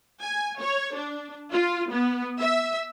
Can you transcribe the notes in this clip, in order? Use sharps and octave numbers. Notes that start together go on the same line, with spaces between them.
G#5
C#5
D4
F4
B3
E5